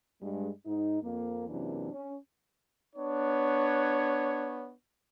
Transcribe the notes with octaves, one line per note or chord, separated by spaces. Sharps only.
G2 G#3
G#2 D#4
F2 A#3
F#2 C3 E3 A#3 D4
C#4
B3 D4 C#5